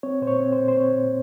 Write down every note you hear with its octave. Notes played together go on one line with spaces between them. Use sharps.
C4 C#5
A#2 C5
C#5
C4
C5
A#2
C5
C4 C#5
A#2